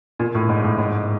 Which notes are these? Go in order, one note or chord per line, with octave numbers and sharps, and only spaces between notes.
A#2
A2
G#2
A2
G#2